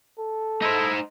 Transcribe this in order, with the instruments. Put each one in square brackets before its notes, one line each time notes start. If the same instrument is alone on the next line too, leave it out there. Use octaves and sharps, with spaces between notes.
[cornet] A4
[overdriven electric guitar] D#4 C5 [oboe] E4